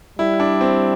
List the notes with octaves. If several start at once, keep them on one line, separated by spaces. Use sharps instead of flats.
G3 E4
D4
C4